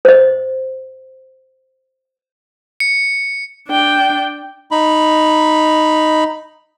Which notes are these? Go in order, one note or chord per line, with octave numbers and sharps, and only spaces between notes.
C5 D#5
C#7
D4 G5
D#4 B5